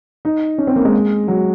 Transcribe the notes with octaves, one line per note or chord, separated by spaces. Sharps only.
D#4
C#4
C4
A#3
G#3
F#3